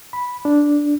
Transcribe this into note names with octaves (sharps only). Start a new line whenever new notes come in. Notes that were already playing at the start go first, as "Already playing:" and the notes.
B5
D4